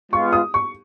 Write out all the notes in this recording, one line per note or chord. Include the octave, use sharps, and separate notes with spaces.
G#3 B3 F4 C#6
D#6
C#6